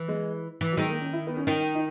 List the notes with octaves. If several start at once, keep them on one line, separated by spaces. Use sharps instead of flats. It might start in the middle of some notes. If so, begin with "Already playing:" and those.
Already playing: E3
G#3
E3
F#3
D#3 G#3
A#3
C#4
E4
B3
C#4
D#3 D#4
D#4